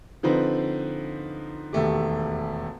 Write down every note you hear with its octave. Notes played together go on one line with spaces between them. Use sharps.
D3 F3 C4 D#4 B4
E1 D#2 A3 G4